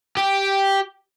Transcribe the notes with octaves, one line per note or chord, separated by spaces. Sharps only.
G4